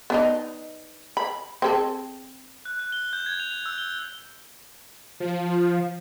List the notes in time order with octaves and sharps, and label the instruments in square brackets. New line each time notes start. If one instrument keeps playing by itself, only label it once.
[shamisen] B3 D4 D#4
B5
C4 G#4 A4
[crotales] F#6
F#6
G7
G6
G#6
F7
E6
G7
[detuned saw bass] F3